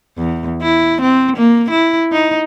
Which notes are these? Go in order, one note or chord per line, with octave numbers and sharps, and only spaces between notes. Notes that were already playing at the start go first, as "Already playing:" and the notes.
E2
E4
C4
A#3
E4
D#4